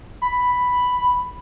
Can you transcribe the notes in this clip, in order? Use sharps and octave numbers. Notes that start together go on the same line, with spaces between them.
B5